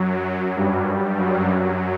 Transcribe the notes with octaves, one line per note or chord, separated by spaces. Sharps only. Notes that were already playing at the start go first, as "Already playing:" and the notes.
Already playing: F#2 F#3
G2 G3
F#2 F#3
F#2 F#3